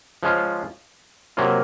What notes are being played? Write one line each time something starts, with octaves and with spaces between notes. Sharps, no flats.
F3 G#3 C#4 F4
C3 F#3 A#3 C#4 F4